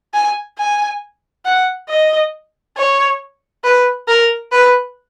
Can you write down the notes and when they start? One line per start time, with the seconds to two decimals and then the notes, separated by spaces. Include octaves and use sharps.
0.14 G#5
0.58 G#5
1.45 F#5
1.89 D#5
2.77 C#5
3.64 B4
4.08 A#4
4.52 B4